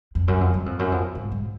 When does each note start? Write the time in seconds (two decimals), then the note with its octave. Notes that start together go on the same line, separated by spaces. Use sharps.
0.15 F2
0.28 F#2
0.41 F2
0.54 F#2
0.66 F2
0.79 F#2
0.92 F2
1.15 G#2
1.32 G#2